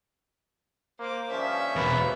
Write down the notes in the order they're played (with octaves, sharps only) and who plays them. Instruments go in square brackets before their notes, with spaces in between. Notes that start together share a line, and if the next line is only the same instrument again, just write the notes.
[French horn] A#3 [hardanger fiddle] C5 D6
[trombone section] G2 F3 [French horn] C#4 [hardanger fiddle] E5
[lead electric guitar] E2 B2 [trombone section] G#2 A#3 B4